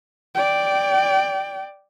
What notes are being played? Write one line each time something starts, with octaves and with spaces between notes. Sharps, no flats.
D5 G5